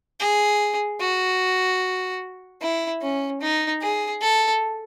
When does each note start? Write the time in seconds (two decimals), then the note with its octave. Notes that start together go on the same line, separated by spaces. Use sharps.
0.20 G#4
1.00 F#4
2.61 E4
3.02 C#4
3.41 D#4
3.82 G#4
4.21 A4